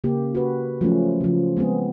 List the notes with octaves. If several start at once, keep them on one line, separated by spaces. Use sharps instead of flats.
C#3 A#3 G4
F#4 B4
F3 F#3 A3 C#4
C#3 F3
G#3 B3 C4 G#4